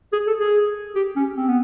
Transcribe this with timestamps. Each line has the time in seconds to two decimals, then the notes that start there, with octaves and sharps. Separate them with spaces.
0.13 G#4
0.27 A4
0.40 G#4
0.95 G4
1.16 C#4
1.37 C4
1.48 B3